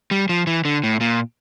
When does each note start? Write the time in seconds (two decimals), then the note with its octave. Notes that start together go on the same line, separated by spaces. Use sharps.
0.11 G3
0.29 F3
0.47 E3
0.65 D3
0.84 A2
1.01 A#2